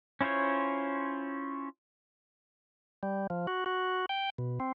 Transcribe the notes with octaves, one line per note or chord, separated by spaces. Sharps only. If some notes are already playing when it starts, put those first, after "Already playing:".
C#4 E4 F4 C5 C#5
G3
F3
F#4
F#4
G5
B2
C4